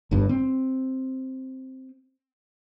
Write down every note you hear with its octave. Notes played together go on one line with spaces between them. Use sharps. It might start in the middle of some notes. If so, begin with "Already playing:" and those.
G1 G2
C4